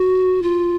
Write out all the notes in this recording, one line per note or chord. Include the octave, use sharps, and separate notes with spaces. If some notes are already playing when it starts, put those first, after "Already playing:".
Already playing: F#4
F4